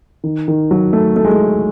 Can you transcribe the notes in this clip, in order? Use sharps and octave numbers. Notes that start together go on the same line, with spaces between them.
D#3
D#3
F#3
A3
A3
G#3
A3